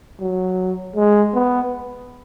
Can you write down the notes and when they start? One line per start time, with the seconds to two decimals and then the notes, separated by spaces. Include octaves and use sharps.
0.20 F#3
0.96 G#3
1.34 B3